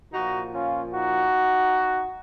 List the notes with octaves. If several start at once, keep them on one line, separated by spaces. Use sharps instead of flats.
A#2 F3 D#4 F#4
C#4 F4
D#4 F#4